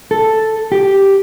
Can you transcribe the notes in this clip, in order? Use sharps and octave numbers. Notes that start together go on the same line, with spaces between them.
A4
G4